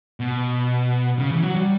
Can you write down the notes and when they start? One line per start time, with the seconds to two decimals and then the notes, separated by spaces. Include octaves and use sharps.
0.20 B2
1.19 C#3
1.30 E3
1.42 F#3
1.56 G3